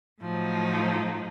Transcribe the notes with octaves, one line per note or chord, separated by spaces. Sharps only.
A2 F3 F#3 D#4